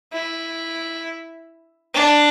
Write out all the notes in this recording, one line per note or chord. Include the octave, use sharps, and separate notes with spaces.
E4
D4